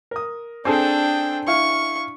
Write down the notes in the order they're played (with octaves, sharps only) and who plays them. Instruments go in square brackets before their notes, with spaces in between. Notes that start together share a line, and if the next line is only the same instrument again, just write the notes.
[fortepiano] A#4 D#6
[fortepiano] C4 G#4 A4 [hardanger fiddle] D4 G5
[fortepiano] E4 F5 [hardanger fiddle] C#6